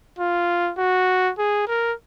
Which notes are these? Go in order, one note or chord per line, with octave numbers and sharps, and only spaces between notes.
F4
F#4
G#4
A#4